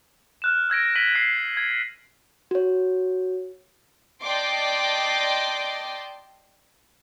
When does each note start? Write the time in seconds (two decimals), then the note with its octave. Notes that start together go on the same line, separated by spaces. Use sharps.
0.42 F6 F#6 E7
0.70 E6 G#6 A#6 D7
0.96 B6 D7 D#7 F#7 G7
1.15 F#6 A#6 C7
1.57 G#6
2.51 F#4 C#5
4.22 D5 D#5 G5 A5 C6 D6